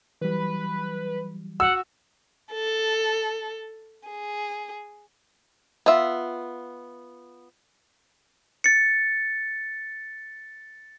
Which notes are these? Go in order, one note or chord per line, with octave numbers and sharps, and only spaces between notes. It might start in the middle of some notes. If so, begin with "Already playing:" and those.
E3 F#3 G3 B4
F#4 F#5 E6
A4
G#4
B3 F4 E5
A6 C#7